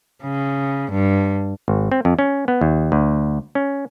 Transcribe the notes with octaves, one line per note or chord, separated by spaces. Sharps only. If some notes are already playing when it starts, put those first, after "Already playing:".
C#3
G2
G#1
C4
F2
C#4
B3
D#2
D2
C#4